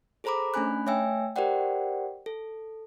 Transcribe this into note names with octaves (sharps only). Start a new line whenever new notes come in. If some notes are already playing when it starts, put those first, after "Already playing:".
G#4 A4 C5 A#5 B5 D6
A3 C#4 D4 G#5 B5 F#6
A3 C#5 E5 G5 G#5 E6
G4 A#4 C5 D5 F#5 G5
A4